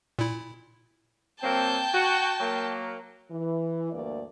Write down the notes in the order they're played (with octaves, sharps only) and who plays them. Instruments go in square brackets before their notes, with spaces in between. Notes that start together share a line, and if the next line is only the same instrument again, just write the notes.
[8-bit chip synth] A#2 E4
[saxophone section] F#3 A#3 C4 [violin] G5 A5
[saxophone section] F#4
F#3 A#3
[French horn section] E3
D2 G2 A#3 D5